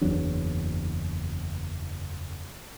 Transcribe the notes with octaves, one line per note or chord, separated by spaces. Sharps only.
F#1 E2 F#3 D4